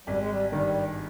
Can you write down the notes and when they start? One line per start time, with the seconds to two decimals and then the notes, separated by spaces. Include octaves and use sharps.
0.07 G#1 G3
0.18 G#3
0.29 G3
0.52 G2 D#3 G3